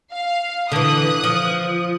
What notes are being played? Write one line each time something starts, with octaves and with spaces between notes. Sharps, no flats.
F5
D3 E3 D#6 F#6
F3